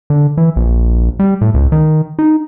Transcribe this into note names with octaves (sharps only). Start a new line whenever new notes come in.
D3
E3
A#1
G3
A2
C#2
D#3
D#4